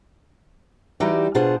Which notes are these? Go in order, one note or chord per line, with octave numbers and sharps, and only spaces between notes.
E3 G3 D#4 F#4 G4 D5
B2 D4 F4 G#4 C5 F#5